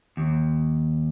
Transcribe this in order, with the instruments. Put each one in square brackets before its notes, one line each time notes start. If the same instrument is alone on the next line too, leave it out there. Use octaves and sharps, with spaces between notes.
[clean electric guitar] D#2